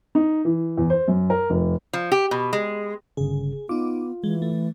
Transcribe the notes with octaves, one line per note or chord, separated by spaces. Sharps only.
D#4
E3
E2
C5
F#2
A#4
F1
F3
G4
B2
G#3
G1 C#3 G#4
B3 D#4 F4 D6
E3 G#3
A3